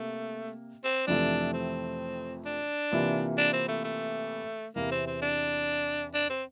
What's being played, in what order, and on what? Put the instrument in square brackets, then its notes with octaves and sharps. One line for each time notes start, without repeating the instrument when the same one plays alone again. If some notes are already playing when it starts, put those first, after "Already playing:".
Already playing: [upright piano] C3 A#3 [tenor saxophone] A3
[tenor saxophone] C4
[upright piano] F2 C3 E3 A3 [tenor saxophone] D4
[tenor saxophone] C4
D4
[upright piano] C3 E3 A#3 F4
[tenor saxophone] D4
C4
A3
A3
[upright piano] E2 C3 E3 [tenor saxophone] A#3
[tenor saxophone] C4
C4
D4
D4
C4